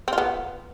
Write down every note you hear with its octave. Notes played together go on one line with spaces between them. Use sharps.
B3 C4 F4